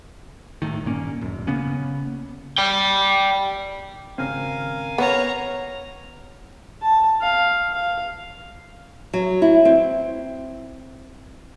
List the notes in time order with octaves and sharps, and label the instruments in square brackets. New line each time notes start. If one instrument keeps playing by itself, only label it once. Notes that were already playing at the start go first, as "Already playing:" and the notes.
[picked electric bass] G#1 A2 D#3
G2 A#2 A#3 C#4
D1 F#2
C#3 A#3 B3 C#4
[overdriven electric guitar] D5 G5
[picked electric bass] G#1 C#3 C4 [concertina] A#4 F5 G#5
[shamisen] B3 [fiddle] C#5 A#5
[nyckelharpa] A5
F5
F5
[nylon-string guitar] F#3
E4
C4